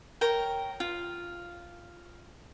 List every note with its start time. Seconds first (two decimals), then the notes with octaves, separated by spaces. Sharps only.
0.21 A#4 C#5 G5
0.80 F4